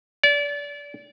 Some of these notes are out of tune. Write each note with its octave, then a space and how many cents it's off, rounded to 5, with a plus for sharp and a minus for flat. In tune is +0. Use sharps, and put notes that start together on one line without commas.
D5 -30